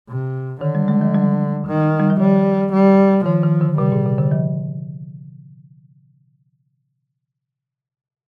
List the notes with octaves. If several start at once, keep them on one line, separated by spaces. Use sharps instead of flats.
C3
D3 D#3
G3
G#3
F3
G3
D#3
G3
F3
D#3 G3
G3
D#3 F3
D#3
D3
C3 G3
A#2
C3
D3
F3